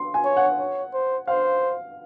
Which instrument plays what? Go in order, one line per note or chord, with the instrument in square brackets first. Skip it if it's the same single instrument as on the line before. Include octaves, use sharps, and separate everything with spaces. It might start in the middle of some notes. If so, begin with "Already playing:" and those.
Already playing: [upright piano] C6
G#5
[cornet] C#5
[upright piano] F#5
[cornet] C#5
C5
[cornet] C5 [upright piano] F5